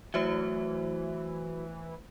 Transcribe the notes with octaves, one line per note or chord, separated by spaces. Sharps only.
E3 F#3 A3 C5 E5